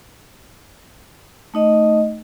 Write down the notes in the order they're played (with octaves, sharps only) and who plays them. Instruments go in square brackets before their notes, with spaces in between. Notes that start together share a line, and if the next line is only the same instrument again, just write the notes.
[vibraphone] A3 D#4 D#5